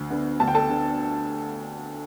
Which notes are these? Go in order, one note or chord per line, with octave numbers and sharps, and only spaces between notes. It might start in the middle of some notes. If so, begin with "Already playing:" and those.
Already playing: D2
D3 B3
D2 A5
G5
A4 A5
D3 B3